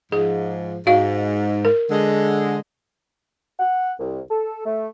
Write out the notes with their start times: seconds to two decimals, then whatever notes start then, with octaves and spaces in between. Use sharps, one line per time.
0.12 G#2 F3 G#4
0.87 G#2 F#4 F5
1.65 A#4
1.90 D3 G#3
3.60 F#5
4.00 C2
4.31 A4
4.66 A3